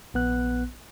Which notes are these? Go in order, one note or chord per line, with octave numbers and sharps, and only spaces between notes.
A#1 B3 F#6